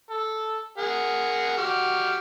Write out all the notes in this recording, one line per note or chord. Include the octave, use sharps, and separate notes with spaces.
A4
G#4 A#4 F#5
F#4 G4 F6